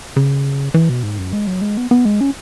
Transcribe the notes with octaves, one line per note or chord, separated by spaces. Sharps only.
C#3
E3
B2
G#2
F#2
G#3
F#3
G#3
B3
B3
G#3
C#4